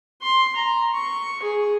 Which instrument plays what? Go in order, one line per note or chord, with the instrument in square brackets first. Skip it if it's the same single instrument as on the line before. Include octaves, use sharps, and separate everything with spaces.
[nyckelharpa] C6
A#5
C#6
G#4